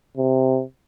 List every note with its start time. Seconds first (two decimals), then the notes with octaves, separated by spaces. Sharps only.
0.17 C3